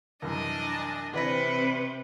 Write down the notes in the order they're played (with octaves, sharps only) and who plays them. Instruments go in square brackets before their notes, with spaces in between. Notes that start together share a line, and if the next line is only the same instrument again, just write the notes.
[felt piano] C2 F#2 E3 [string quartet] D4 D#5 G#5
[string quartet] C3 C4 [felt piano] E3 D5 A#6 [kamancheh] B4